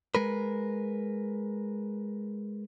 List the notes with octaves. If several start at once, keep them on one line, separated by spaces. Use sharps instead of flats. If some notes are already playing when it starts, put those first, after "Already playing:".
G#3 A#4 B4